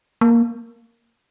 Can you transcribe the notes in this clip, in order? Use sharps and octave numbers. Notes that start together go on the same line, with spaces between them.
A#3